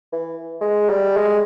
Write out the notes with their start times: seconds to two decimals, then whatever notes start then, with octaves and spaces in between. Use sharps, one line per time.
0.13 E3
0.61 G#3
0.89 G3
1.17 G#3